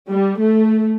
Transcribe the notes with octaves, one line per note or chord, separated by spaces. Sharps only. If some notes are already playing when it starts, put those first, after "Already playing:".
G3
A3